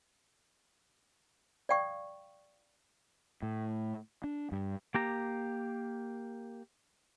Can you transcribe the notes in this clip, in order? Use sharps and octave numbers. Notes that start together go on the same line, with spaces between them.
D5 F5 G5 C#6 D#6
A2
D4
G2
A#3 G4 A#5